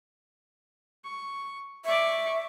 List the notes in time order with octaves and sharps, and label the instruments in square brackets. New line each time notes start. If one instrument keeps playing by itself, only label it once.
[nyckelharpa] C#6
[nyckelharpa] D5 C#6 [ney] E5